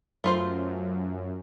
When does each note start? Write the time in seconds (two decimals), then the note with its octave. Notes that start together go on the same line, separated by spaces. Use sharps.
0.24 F#2 A3 F4 C5